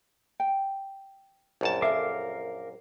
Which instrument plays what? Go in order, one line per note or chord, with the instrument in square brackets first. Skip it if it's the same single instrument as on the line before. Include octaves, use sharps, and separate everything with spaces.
[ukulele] G5
[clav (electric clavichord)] A#1 F#2 A5
[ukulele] A4 E5 [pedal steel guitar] A#4 F5 D6